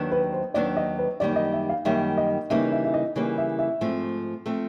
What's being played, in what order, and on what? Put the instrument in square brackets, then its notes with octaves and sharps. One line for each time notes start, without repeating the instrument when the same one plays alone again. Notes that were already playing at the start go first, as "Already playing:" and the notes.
Already playing: [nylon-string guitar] D#2 D#3 F#3 B3 D4
[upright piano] B4
C5
[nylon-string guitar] D#2 D#3 F#3 B3 D4 [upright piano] D5
[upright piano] D#5
B4
[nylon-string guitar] F#2 D#3 G3 A#3 D#4 [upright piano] D5
[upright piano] D#5
E5
F5
[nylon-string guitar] F#2 D#3 G3 A#3 D#4 [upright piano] E5
[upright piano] D#5
[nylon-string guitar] C#3 E3 G3 A#3 D#4 [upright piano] E5
[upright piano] E5
E5
D#5
[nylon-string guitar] C#3 E3 G3 A#3 D#4
[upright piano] E5
E5
[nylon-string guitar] G#2 F3 A3 C4
F3 A3 C4